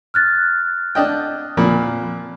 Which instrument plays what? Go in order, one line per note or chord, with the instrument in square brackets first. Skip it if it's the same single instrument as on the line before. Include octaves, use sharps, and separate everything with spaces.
[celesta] F6 F#6 A6
[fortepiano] D4 D#5 G5
A#2 F3 B5